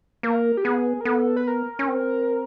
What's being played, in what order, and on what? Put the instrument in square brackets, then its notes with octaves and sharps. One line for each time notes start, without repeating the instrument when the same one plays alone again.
[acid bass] A#3 [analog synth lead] A#4
[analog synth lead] G4
[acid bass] B3 [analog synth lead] G#4
[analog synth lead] A#4
[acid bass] B3 [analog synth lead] A4
[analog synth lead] B4
A#4
[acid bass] C#4
C4